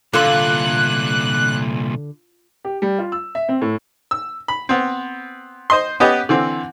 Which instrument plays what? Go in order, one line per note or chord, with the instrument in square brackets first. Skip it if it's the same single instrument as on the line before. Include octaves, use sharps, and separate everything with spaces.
[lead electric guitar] C2 A#2 [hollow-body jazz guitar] D3 A4 C6 [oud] F4 [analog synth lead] F#6
[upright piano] G4
G3
F4
E6
E5
C4
A2
[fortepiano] E6
B5
B3 C4
C5 D#5 C6
B3 C#4 G4 B4 D#5
D3 E3 C4